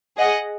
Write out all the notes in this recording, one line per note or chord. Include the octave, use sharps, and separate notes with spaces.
G#4 D#5 F#5